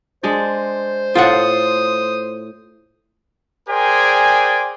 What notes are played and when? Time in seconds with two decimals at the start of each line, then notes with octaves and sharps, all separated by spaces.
0.23 G#3 D4 C5 D5
1.15 A2 F4 A4 F#5 G5 D#6
3.69 G#4 A#4 C5 D5 G5 G#5